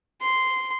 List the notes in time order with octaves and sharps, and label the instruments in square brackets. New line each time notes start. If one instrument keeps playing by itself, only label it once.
[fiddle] C6